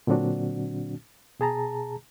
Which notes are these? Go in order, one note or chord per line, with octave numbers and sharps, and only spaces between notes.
A#2 D3 F#3 C4 D4 F#4
B2 G#4 A5 A#5